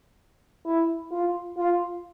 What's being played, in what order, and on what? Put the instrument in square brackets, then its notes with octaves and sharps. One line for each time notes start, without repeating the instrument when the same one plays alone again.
[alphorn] E4
F4
F4